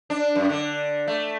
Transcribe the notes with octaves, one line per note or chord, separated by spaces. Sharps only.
D4
F#2
D3
A3